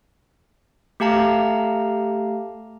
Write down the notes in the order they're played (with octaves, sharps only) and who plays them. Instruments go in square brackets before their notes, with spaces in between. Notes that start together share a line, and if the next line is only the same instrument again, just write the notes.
[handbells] A3 G4 F5 A5 A#5